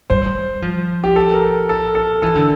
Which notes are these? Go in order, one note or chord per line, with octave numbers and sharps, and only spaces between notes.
G3 C5
F3
G4
A4
A#4
A4
A4
E3 A4
D3